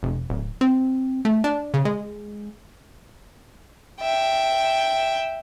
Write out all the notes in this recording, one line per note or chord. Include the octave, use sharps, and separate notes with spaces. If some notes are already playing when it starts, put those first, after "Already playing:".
F1
D1
C4
A3
D4
C#3
G#3
E5 G5